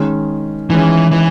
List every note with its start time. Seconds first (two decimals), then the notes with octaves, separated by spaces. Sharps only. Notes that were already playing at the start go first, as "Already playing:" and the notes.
Already playing: D#3 G#3 C#4
0.70 D#3 E3 G#3 C#4
1.11 E3